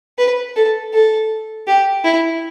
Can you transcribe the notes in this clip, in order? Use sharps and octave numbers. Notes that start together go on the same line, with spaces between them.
B4
A4
A4
G4
E4